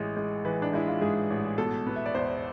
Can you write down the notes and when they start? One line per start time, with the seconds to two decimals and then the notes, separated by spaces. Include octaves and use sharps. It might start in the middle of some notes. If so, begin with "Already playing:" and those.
Already playing: A1 E3 G#3
0.17 G#3
0.45 E3 B4
0.62 D4
0.73 G#3 E4
0.88 F4
1.01 G#2 G#4
1.30 A1
1.58 B2 A4
1.87 B3
1.96 E5
2.06 D5
2.15 E2 C5